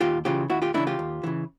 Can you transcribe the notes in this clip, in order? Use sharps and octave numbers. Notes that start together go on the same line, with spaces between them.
D#2 F4 G4
C#3 E3 F4 G4
D#2 E4 F#4
F4 G4
C#3 E3 D4 E4
F4 G4
D#2
C#3 E3